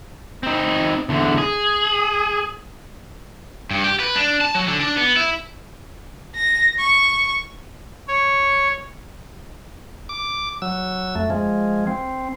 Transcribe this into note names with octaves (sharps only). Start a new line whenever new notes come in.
C4 D#4
E2 D3
G#4
G2
G4
B4
D4
A5
F#3
D3
D4
B3
E4
A#6
C#6
C#5
D6
F#3 E6
F2 A3
F3 G#3
C4